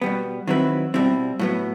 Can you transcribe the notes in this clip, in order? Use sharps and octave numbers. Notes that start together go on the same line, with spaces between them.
B2 G3 B3
D#3 F#3 C4 E4 B4
B2 G3 C4 E4
A2 F#3 B3